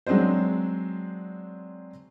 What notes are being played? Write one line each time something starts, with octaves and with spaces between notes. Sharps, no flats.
F#3 G#3 C4 D4 C5